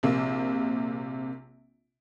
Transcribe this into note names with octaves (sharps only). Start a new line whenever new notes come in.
A#1 C3 A#3